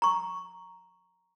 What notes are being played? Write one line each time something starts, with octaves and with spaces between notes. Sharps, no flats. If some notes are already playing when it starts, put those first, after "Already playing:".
A#5 C#6